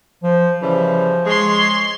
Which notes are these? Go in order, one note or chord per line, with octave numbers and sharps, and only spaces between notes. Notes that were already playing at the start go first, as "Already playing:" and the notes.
F3
C#3 E3 F3 G3
G#3 C#5 C6